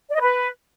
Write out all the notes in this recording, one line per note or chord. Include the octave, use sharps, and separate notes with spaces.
D5
D#5
B4